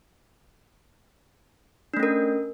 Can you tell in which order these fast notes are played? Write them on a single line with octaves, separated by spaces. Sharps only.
D4 A3 C#4 A#4